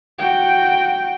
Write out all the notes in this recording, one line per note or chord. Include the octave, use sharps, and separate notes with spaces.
F#4 G5